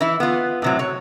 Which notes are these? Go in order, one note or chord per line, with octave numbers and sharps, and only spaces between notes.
E3 E4
B3 F4
A2 C3 F#3
C#5